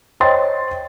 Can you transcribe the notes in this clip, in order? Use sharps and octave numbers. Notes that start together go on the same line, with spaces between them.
C5 C#5 D#5 G5 C6 A6